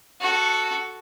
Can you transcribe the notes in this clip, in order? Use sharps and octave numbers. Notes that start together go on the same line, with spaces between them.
F#4 A4